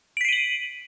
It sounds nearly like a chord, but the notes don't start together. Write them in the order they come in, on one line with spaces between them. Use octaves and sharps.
D7 B6 C7 D#7 F#7